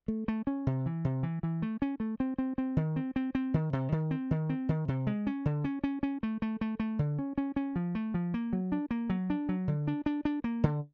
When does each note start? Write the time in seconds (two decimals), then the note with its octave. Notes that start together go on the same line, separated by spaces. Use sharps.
0.08 A3
0.28 A3
0.47 C#4
0.67 C3
0.86 E3
1.05 C3
1.23 E3
1.43 E3
1.62 A3
1.82 C#4
2.00 A3
2.20 C4
2.38 C4
2.58 C4
2.77 D#3
2.96 C4
3.16 C4
3.35 C4
3.54 D#3
3.73 C3
3.92 D#3
4.11 C4
4.31 D#3
4.49 C4
4.69 D#3
4.88 C3
5.07 G#3
5.27 C#4
5.45 D3
5.64 C#4
5.84 C#4
6.03 C#4
6.23 A3
6.42 A3
6.61 A3
6.80 A3
6.99 D3
7.19 C#4
7.38 C#4
7.56 C#4
7.76 F3
7.95 A3
8.14 F3
8.34 A#3
8.53 F#3
8.72 D4
8.91 A#3
9.10 F#3
9.30 D4
9.49 F#3
9.68 D3
9.87 D4
10.06 D4
10.25 D4
10.44 A#3
10.64 D3